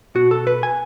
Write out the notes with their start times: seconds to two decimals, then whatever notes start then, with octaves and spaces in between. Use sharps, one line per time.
0.15 B2 F#4
0.31 A4
0.47 B4
0.63 G#5